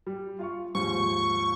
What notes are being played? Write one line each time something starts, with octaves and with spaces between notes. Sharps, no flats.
G3
F4 F5 C#6
D#2 G#2 F3 C#6